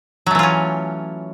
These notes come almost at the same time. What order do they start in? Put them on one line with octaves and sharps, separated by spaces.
F#3 A3 E3 F4 C#4